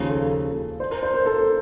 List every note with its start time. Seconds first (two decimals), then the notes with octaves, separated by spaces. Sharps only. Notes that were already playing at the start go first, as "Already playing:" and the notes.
Already playing: D#2 C#3 F3
0.09 A4
0.80 C5
0.91 A#4
1.03 C5
1.14 C5
1.26 A4